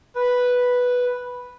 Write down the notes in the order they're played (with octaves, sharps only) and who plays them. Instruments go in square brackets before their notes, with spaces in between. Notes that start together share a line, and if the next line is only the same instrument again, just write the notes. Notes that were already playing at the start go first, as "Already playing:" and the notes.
[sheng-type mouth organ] B4